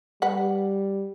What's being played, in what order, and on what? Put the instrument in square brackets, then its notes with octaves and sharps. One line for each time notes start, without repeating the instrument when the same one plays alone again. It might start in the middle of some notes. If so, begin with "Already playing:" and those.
[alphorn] G3 [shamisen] B4 F#5